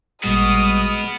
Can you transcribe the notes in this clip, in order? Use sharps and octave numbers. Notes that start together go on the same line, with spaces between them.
A1 A#2 G3 G#3 B3 F#4 D#6 F6